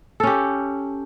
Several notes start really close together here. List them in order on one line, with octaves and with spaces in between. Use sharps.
A4 C#4 G4